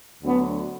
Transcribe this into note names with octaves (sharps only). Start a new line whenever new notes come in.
D2 D3 F#3 B3 D4